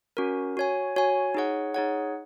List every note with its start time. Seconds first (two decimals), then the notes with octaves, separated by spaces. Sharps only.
0.17 C#4 F#4 A#4
0.57 F#4 C#5 G#5
0.96 F#4 C#5 G#5
1.35 D#4 G#4 C#5 F#5
1.75 D#4 G#4 C#5 F#5